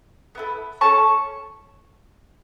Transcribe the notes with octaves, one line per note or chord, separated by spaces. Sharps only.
B3 E4 A4
C#4 A4 A5 C#6